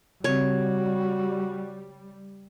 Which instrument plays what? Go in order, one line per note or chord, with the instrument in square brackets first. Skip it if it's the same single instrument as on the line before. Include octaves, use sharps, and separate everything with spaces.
[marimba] C#3 C4 [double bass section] G3 [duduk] F#4 [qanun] C#5